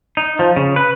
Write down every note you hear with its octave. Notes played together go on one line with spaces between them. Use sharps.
D#4
F3
C#3
B4